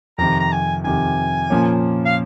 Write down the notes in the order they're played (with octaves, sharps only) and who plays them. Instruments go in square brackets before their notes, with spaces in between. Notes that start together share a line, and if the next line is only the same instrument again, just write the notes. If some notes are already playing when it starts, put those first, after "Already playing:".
[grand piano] F2 C3 D#3 [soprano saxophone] A#5
[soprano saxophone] A#5
G#5
[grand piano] F2 C3 D#3 [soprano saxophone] G#5
[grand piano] A#2 F3 A#3 C#4
[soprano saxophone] F5